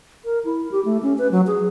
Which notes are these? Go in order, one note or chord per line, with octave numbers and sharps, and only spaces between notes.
A#4
E4
G4
A3
C#4
B4
F#3
G#4